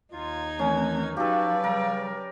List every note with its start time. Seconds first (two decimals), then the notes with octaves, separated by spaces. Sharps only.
0.12 D#2 D#4 F4 G#6
0.59 D#3 E3 A3 C4 C#4
1.17 F#3 D#4 F#4 G4 A4 B4 D5 F5
1.64 C#3 G3 A#4